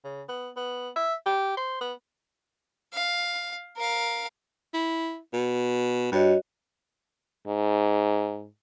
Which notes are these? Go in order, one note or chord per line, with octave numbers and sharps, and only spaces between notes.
C#3
B3
B3
E5
G4
C5
B3
F5
A#4 F5
E4
B2
G2 F#4 C#5 D#5
G#2